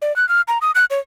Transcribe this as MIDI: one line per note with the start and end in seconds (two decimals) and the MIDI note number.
0.02 0.15 74
0.16 0.28 90
0.29 0.41 89
0.48 0.58 82
0.62 0.71 87
0.75 0.85 90
0.90 0.99 73